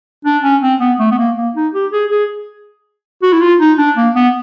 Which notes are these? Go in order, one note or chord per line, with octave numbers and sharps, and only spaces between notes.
D4
C#4
C4
B3
A3
B3
A#3
A#3
D#4
G4
G#4
G#4
F#4
E4
F4
D#4
D4
A#3
B3